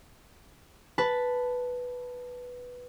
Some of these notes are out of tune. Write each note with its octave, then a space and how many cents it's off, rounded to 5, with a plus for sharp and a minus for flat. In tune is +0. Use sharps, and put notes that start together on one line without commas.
B4 +0 A5 +0